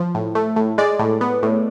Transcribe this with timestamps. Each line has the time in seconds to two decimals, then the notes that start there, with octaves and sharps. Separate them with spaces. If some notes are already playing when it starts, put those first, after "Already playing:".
Already playing: F3
0.15 A2
0.35 A3
0.56 A2
0.78 G#3 D5
0.99 A2
1.21 B3
1.43 A2